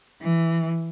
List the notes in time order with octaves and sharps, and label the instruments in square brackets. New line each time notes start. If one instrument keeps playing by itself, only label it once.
[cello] E3